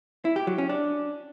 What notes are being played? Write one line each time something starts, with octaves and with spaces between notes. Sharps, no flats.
E4
G4
F#3
C#4
D4